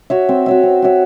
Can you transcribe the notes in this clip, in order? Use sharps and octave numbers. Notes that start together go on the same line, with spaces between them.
F#4 C#5 E5
C4
F#4 C#5 E5
C4
F#4 C#5 E5